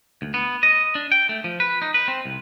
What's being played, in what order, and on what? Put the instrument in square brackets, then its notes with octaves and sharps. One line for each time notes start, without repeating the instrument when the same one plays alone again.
[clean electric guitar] D2
B3
D#5
D4
G5
A3
F3
B4
D#4
B4
C4
C2